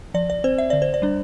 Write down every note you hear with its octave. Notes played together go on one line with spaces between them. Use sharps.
F3 D5
D5
C4 C5
E5
D3 D5
C5
D5
G3 D4